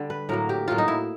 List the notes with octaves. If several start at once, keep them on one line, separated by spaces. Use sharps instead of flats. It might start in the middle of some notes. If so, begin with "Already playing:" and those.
Already playing: D3 G3
B4
A2 F#3 A#3 A#4
G4
A2 F#3 A#3 F4
D#4
E4